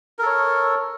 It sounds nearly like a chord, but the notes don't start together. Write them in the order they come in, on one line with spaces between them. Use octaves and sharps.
A#4 A4 C#5